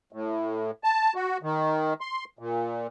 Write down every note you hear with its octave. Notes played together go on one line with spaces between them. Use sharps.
A2
A5
F#4
D#3
C6
A#2